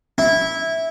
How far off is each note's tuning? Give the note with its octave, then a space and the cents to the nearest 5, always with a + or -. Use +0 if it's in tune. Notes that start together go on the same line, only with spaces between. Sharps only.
E4 -10